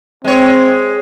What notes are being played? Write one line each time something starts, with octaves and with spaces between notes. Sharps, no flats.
G#3 C4 C#5